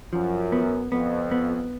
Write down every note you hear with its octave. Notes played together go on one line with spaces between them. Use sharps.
F#2 F3
B3
F2 B3
B3